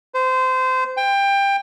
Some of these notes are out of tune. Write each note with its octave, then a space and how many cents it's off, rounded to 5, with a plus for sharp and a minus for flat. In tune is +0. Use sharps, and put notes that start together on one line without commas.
C5 -25
G5 +20